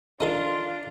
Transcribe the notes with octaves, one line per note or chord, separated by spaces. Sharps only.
D4 D#4 F4 A4 A#4